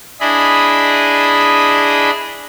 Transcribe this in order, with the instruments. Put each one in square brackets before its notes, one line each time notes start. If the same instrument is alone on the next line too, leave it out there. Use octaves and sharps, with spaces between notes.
[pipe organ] D4 E4 G#4 D#5 B5